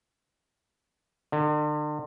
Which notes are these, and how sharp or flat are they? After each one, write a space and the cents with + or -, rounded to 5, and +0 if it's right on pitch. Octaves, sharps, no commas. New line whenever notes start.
D3 +40